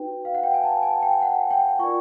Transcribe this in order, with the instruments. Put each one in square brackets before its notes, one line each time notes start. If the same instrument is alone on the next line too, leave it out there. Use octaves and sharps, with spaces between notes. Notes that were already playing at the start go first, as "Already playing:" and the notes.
Already playing: [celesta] D#4 F#4 B4 G5
F5
F#5
G5
G#5
A5
G#5
G5
F#5
G5
F4 A#4 D5 C#6